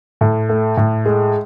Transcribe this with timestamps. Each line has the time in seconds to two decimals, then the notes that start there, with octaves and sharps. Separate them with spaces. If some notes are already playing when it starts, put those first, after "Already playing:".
0.21 A2
0.49 A3
0.77 A2
1.05 G#3